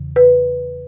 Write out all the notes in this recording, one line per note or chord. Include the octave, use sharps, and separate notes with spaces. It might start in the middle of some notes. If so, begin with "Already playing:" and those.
Already playing: E2 C#3 E3
B4